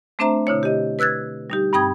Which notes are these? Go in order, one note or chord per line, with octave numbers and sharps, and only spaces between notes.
A3 C4 D4 C5 E5 A#5
B2 D3 E4 C#5
G4 D#5
B4 E6 F#6 G#6 A6
G3 D#4 G4
G2 C4 G5 B5 D#6 G#6